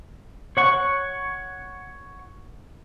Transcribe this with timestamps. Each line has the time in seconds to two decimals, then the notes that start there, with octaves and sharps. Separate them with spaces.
0.57 C#5 F#5 C#6